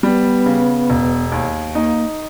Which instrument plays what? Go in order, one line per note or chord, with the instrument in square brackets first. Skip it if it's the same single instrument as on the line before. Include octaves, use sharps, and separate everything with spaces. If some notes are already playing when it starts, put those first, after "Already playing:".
[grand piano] G3 [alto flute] B3
[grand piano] C#3
E1
D#2
[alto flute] A#3 [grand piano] D#4